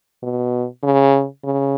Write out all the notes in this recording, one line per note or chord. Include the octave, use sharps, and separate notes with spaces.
B2
C#3
C#3